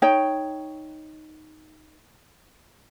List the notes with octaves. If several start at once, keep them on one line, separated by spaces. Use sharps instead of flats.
D#4 C#5 G5